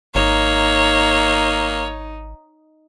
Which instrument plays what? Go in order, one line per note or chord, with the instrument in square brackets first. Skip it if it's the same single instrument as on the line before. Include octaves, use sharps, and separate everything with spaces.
[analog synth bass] G#1 [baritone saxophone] A#3 [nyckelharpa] D#4 [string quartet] C#5